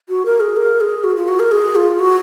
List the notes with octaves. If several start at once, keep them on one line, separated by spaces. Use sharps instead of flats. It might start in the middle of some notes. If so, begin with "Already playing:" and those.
F#4
A#4
G#4
A#4
G#4
F#4
F4
F#4
A#4
G#4
F4
F#4